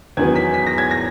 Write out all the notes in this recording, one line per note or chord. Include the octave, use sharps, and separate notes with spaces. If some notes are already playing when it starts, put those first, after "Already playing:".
E2 D#3 F#3 B3 G#6
B6
B6
A#6
G#6
A#6